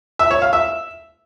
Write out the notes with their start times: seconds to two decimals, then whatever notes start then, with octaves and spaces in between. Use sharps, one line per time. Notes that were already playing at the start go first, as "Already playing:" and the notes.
0.19 E5
0.31 C#5
0.42 F5
0.53 E5